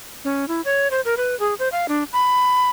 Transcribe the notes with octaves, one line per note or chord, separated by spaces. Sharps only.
C#4
E4
C#5
C5
A#4
B4
G#4
C5
F5
D4
B5